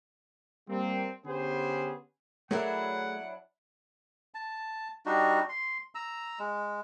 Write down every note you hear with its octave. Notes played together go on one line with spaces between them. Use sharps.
G3 A#3 C4
D3 B3 C#4 G4 G#4 C5
F#3 A3 D4 E4 G#4 A#4 F#5
A5
G3 D4 D#4 F#4
C6
A#5 E6
G#3